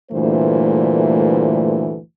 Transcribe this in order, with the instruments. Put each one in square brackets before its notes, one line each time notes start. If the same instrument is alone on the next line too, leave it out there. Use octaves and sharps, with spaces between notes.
[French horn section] D2 G2 A#2 E3 A3 C5